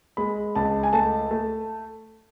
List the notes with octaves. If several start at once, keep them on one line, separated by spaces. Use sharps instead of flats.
G#3 B5
C#2 A5
G#5
A3 A5
A3